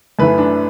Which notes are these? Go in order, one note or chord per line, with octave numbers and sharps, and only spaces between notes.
F#2 E3 A3 B4
D4